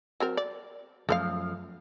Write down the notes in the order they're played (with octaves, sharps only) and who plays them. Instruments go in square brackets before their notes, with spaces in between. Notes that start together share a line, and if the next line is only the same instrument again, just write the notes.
[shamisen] F#3 C4 A#4
D5
[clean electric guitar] F#2 F3 [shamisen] A3 C5 F5